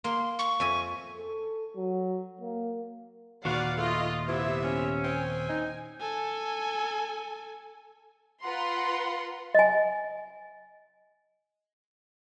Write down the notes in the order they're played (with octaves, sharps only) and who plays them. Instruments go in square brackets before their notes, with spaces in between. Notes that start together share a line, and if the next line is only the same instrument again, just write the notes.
[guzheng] A#3 [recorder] C6
[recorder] C#6
[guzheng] F2 E5 G#5
[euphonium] A4
F#3
A#3
[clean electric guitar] D#2 A#2 [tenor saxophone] F#4 [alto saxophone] B4 [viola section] D5 F5 F#5
[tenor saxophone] A3 [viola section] F4 D#5 [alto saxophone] F5
[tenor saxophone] C3 [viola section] B3 E5 [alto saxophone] E4
[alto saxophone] C#4
[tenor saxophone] C4 [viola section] G#5
[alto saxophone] D#4
[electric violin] A4 G#5
[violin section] F4 B4 F#5 A#5 C6
[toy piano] D#5 G#5